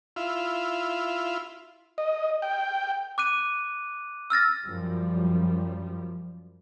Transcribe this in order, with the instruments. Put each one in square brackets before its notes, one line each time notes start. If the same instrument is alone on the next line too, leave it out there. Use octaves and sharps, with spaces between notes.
[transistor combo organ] E4 F4
D#5
G5
[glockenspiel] D6 F#6 D#7
E6 F6 A6 A#6
[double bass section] F#2 F3 G3